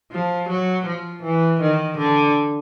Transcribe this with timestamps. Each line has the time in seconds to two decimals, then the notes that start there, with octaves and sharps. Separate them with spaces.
0.12 F3
0.49 F#3
0.86 F3
1.23 E3
1.60 D#3
1.98 D3